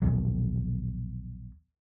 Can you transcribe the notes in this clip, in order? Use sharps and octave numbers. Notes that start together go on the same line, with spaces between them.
A#1 D#2 B2 F#3